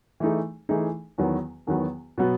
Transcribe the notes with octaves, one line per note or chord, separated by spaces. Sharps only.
E3 A3 D#4 G#4
E3 A3 D#4 G#4
E2 D#3 F#3 B3 F#4
E2 D#3 F#3 B3 F#4
B2 F#3 B3